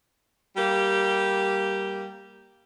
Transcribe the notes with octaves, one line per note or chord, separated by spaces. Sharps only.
G3 A#3 G4